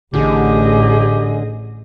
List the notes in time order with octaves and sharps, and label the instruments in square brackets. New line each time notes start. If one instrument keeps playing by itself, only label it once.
[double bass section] A1 [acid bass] D3 [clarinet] G4 [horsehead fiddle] G#4 D#5